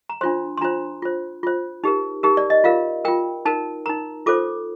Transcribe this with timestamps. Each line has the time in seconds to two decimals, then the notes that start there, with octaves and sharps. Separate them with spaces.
0.10 A#5
0.21 D4 F4 C5 C6
0.57 C6
0.61 D4 F4 C5 A#5
1.02 F4 C5
1.43 F4 C5
1.84 D#4 G4 A#4
2.23 D#4 G4 A#4
2.37 D5
2.50 D#5
2.64 F4 A#4 F5
3.05 F4 A#4 G5
3.45 D#4 A#4 A5
3.86 D#4 A#4 A#5
4.26 F4 A4 C5 D6